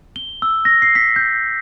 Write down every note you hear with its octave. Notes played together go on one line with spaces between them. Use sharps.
G7
E6
A#6
C7
B6
G6